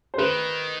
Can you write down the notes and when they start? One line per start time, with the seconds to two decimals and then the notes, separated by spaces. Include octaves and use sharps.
0.14 C5
0.18 D#3 B4